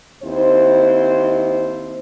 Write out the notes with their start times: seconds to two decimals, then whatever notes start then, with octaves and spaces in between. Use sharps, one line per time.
0.23 D#2 C4 E4 C5